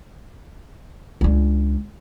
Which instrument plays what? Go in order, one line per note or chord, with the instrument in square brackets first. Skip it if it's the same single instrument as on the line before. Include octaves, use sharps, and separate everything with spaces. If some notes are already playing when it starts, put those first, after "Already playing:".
[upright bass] C#2 D4